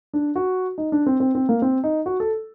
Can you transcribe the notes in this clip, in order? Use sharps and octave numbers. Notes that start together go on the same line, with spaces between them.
D4
F#4
D#4
D4
C4
C4
C4
A#3
C4
D#4
F#4
A4